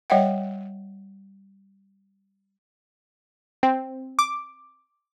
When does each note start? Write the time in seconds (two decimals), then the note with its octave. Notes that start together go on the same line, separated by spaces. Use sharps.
0.10 G3 C#5 D#5 E5 F#5 G5
3.63 C4
4.19 D6